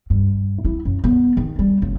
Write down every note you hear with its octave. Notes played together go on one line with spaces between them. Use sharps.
G2
E4
F#2
B3
D#3
G3
F#1